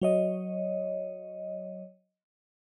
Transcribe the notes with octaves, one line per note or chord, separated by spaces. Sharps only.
F#3 C#5 D#5